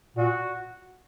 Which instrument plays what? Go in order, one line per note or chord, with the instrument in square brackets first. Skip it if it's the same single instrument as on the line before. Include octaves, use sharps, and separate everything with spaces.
[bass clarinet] A#2 [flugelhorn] F#4